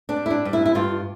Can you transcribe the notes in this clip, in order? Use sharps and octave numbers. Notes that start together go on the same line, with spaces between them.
D4
G3
E4
D4
G2
E4
E4
G2 F4